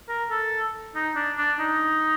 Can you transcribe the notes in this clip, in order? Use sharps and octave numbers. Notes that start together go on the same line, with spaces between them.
A#4
A4
D#4
D4
D4
D#4